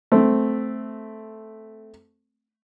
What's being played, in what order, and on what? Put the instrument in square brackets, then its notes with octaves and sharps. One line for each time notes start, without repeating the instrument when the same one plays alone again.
[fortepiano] A3 C4